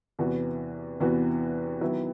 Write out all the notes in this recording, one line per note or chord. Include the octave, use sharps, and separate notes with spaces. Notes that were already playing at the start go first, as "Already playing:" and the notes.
E2 C3 E3 B3 F#4
E2 C3 E3 B3 F#4
D#3 F#3 B3 E4